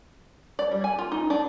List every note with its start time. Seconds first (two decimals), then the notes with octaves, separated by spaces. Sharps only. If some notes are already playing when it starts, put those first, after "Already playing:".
0.59 D5
0.71 G3
0.84 G#5
0.98 F4
1.12 D#4
1.30 D4